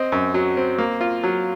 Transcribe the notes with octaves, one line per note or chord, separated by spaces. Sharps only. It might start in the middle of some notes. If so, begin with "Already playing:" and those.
Already playing: C4 D#5
F#2
F#3
C4
A#3
F4
F#3